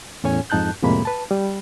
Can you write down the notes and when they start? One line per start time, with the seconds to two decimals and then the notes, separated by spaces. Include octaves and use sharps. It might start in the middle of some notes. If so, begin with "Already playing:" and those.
0.24 E2 A2 C#4 C#5 G#5
0.50 F2 G#2 D#4 A5 F#6 G6
0.82 F2 A2 C3 G#3 A#3 B5
1.05 B4 A5
1.31 G3